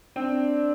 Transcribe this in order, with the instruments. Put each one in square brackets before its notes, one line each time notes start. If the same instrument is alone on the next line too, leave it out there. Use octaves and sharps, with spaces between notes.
[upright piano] C4 [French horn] D4